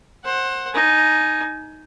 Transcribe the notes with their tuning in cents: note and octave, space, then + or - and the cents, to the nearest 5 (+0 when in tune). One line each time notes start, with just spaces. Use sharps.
C5 +25 F#5 +0
D#4 +0 G#5 +20